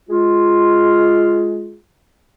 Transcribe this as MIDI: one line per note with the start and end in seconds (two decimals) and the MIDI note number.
0.09 1.78 56
0.09 1.78 65